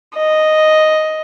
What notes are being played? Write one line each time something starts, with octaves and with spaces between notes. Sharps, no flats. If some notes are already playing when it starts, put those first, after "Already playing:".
D#5